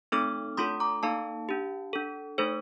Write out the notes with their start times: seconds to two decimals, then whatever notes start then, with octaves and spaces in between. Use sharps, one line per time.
0.12 A3 C4 D#4 A4 D6 F6
0.57 A3 D4 F4 A4 C6 D#6
0.80 A#5 D6
1.03 A#3 D#4 A4 F5 A5
1.49 D4 G4
1.93 D4 A4
2.38 A3 D#4 A4 C5